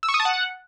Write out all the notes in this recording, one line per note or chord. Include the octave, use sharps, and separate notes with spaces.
E6
C#6
D#6
A5
F#5